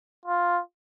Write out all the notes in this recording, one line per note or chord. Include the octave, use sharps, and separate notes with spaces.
F4